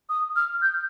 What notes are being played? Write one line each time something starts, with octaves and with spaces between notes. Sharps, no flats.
D#6
F6
G6